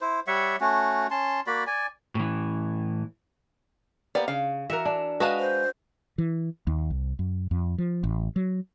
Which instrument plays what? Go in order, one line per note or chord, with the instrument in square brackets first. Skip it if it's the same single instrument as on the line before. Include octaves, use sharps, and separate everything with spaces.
[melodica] E4 C5
G3 C#5 E5 F#5
A3 C#4 F#4
C#4 A5 C6
A#3 F#4 D5 B5
D5 G#5
[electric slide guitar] A2 E3
[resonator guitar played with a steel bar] A#3 B3 [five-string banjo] G4 D5
[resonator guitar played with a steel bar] C#3 [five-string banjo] F5
[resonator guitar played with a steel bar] E3 F#4 A#4 [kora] E5
[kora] D4
[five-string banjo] G#3 A5 [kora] F#4 [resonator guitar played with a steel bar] B4 D#5 F5
[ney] C5
[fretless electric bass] E3
D#2
C2
F#2
F2
F3
A1
F#3